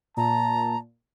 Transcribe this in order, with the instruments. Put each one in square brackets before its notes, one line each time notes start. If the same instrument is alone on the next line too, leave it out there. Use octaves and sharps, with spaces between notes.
[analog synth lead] A#2 [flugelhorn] A5 [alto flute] A#5